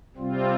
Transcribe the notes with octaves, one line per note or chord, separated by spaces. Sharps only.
C3 G3 C4 F4